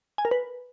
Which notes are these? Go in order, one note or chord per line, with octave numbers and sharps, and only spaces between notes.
G#5
A#4
B4